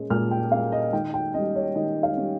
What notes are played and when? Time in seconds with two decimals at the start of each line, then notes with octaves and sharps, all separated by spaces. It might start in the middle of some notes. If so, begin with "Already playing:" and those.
Already playing: A#2 G#3 C#4
0.10 A#2 F6
0.31 G5
0.51 G#3 C#4 F5
0.72 D#5
0.93 D#3 G5
1.14 G5
1.34 G3 C#4 D#5
1.55 C#5
1.75 D#3 D#5
2.03 F5
2.17 G3 C#4